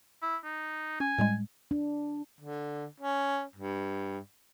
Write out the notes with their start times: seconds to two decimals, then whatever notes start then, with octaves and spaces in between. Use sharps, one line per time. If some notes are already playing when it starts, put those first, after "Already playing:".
0.22 E4
0.44 D#4
1.00 C#4 G#5
1.18 A2 G3 G#3
1.71 D4
2.41 D3
3.00 C#4
3.56 G2